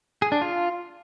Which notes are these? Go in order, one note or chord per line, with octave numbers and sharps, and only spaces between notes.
G#4
D4
F4